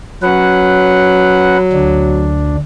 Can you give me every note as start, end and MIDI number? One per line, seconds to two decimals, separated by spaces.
0.23 2.38 54
0.23 1.57 61
0.23 1.57 71
0.23 1.57 78
1.73 2.57 38
1.73 2.57 62